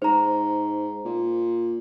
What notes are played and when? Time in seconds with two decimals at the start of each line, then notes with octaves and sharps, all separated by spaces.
0.02 G#2 C5 A#5
1.05 A#2